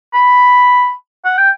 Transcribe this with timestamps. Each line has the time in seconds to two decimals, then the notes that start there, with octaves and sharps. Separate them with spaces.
0.14 B5
1.25 F#5
1.38 G5